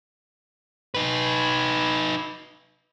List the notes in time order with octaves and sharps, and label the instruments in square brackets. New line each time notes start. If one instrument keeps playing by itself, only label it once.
[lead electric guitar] D#4 B4